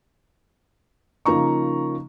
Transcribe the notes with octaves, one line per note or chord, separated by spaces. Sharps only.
C#3 F3 A#3 D#4 A#5 C#6